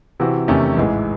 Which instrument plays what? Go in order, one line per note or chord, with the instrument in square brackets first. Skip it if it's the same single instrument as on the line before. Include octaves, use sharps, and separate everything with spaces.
[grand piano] C3 E3 C4 F#4
E2 C3 D#3 A3 C#4
A1 G#2 E3 G#3